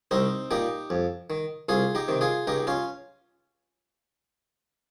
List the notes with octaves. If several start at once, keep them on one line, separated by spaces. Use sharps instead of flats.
C2 C4 D#4
A#2 D#4 G4
F2
D#3
C2 F4 G#4
D#4 G4
C3 D#3
F4 G#4
C#2 D#4 G4
C#4 F4